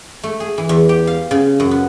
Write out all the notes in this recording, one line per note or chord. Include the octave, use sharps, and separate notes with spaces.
A3
G#4
E3
E2
G4
F5
C#3
F#2
B3